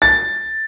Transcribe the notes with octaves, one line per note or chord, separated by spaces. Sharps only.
A6